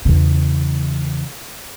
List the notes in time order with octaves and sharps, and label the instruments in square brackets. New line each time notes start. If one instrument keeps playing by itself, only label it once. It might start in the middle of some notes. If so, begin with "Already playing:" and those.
[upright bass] E2 C#3